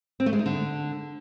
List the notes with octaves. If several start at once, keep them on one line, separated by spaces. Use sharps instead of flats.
C4
A3
G#3
D#4
D3